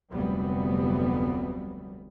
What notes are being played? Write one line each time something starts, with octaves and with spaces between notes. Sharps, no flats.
F1 D2 F#3 G3 B3